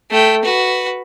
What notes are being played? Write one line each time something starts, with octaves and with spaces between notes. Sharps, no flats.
A3 G5
F#4 B4